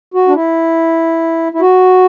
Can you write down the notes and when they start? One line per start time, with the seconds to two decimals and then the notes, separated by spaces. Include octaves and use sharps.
0.14 F#4
0.28 D4
0.35 E4
1.54 E4
1.61 F#4